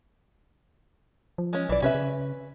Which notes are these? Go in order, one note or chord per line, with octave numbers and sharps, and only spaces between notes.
F3
G#3 C#4
B1 E3 D5
C3 C#4 B4 E5
C#3